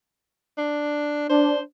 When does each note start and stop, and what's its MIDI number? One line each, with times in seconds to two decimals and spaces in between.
0.58 1.27 62
1.29 1.59 62
1.29 1.61 72